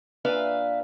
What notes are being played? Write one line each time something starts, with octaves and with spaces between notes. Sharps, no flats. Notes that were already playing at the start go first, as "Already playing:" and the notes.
A#2 D4 B4 E5 F5 G#5